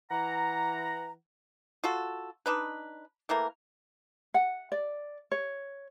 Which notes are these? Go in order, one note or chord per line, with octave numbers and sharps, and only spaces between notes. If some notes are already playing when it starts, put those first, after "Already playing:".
E3 F#5 A#5
F4 F#4 A4
D4 D#4 B4
E3 A3 A#3 A#4
F#5
D5
C#5